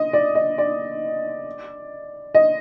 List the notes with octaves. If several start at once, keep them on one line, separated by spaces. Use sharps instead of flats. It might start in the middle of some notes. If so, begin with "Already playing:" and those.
Already playing: D#5
D5
D#5
D5
D#5